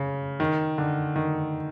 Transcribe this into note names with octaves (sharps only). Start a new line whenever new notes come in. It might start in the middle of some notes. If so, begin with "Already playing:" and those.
Already playing: C#3
D#3
D3
D#3